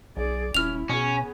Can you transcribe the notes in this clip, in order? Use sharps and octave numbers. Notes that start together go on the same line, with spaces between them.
B1 G#4 D5
D#1 C#4 E4 F6 F7
B2 B3 C#4 G#4